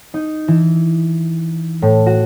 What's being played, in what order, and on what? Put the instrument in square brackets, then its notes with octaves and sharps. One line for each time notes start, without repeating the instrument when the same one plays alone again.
[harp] D#4
E3
A2
F#4